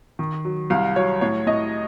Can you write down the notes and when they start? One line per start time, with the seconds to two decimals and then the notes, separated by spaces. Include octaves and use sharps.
0.19 D#3
0.45 F#3
0.70 C2 F5
0.96 F#3 C#5
1.21 A2 C#5
1.47 A2 D#5